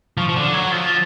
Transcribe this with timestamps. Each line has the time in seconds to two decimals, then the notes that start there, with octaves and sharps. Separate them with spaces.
0.18 F3 C#6
0.29 F3
0.36 D3
0.53 F#3 G#6
0.72 F3 A6